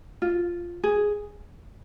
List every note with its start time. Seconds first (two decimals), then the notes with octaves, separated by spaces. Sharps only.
0.22 F4
0.84 G#4